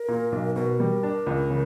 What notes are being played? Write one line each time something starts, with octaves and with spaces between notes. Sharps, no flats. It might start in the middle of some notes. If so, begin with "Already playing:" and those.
Already playing: A#4
A#2
B1
B2 A#4
G3
D4
C#2
C#3